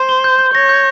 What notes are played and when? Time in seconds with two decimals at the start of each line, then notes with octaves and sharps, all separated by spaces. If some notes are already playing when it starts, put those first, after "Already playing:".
Already playing: C5
0.09 G7
0.24 G6
0.39 G6
0.54 C#5 A#6
0.69 G6